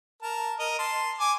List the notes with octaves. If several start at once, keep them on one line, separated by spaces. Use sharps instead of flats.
A#4 A5
A#4 D#5
A5 C6
G#5 D6